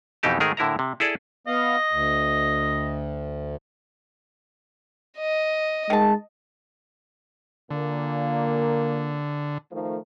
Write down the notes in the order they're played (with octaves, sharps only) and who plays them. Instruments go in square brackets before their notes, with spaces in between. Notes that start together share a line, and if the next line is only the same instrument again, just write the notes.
[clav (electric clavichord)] F2 B2 E3 D#4 G4 A5
G#2 D#3 A3 G#4 A#4
A2 D3 E4 A#4 E5 A#5
C3
E4 G#4 A4 D5
[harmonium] B3 F5 [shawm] D#5
[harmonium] D2
[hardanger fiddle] D#5
[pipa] D#3 A5 [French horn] G#3
[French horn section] A#2 A#3 [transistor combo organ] D3
[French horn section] D#3 F3 A3